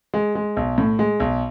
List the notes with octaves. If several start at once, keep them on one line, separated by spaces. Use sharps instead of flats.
G#3
G#3
B1
A2
G#3
B1